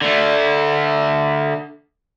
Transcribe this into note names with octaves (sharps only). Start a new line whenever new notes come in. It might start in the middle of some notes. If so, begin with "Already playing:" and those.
D3 A3